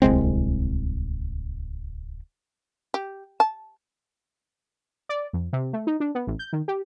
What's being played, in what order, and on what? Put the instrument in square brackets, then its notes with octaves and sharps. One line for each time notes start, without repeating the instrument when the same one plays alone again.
[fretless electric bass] D1 C2 G#3 C4
[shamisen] G4
A5
[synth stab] D5
F2
C3
A3
D#4
D4
B3
A1
G6
D#3
G4